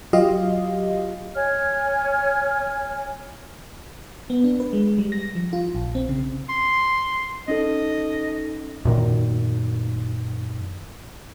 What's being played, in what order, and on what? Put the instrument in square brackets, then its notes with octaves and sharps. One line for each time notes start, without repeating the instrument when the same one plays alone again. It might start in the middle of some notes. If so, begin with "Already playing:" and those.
[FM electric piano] F#3 F4 G4 D#5 F5
[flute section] C#5 G#5 F6
[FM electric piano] B3
D4
B4
G#3
G3
A#6
F3
F4
A#1
C4
C#3
[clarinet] C6
[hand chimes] C#4 D#4 A4 [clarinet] D#5
[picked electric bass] F#2 A#2 D#3